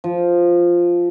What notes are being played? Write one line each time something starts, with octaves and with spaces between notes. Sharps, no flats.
F3